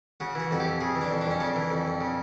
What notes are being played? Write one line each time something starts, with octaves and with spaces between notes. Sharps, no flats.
C#3 F#4
E3 F#4
F2 F#4
G4
F2
C#3 G#4
E3
D4
F2
D4
F2 C#4
C#3 D4
E3
F2
F2
C#3